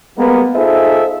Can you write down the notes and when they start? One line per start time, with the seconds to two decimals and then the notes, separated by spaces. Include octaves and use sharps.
0.17 G3 G#3 A#3 B3
0.56 D#4 F4 G#4 A4 C5 E5